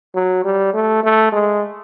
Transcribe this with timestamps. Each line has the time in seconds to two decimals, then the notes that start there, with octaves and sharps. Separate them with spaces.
0.15 F#3
0.44 G3
0.74 A3
1.04 A3
1.32 G#3